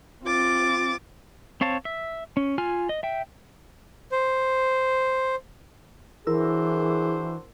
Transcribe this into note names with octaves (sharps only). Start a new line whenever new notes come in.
C4 F4 D6 A6
C4 C#5 F5 A5
E5
C#4
F4 G#5 F6
D#5
E5 G5
C5
E3 D4 E4 F#4 G#4 A#4 C5 E6